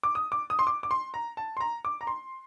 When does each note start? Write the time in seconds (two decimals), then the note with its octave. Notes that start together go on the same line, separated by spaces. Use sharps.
0.03 D6
0.15 D#6
0.32 D6
0.50 D#6
0.59 C6
0.67 D6
0.83 D6
0.91 C6
1.14 A#5
1.37 A5
1.57 C6
1.60 A#5
1.85 D6
2.01 A#5
2.07 C6